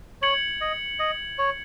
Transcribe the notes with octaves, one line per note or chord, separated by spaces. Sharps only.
C#5 G#6 C#7 F#7
D#5
D#5
C#5